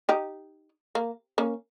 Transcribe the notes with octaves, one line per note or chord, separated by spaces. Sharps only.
D#4 G4
A#3
A#3 C#4